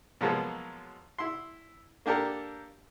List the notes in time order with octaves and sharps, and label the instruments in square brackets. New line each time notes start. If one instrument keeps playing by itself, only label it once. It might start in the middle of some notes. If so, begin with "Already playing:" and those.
[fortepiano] B2 F3 F#3 G#3 A#3 B3
E4 C6
A#3 D4 G4 A4 A#4